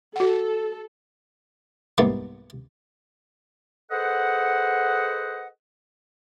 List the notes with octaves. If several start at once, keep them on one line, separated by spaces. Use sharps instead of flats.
F#4 A4 F#5
C2 G#2 A#3 B3
G#4 A4 B4 C5 D#5 F#5